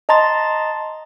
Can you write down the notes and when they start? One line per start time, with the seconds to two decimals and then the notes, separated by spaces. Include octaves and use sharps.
0.09 D#5 A5 A#5 C6 A6